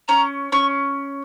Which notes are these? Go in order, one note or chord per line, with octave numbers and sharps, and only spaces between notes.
C#4 A#5
C#4 C#6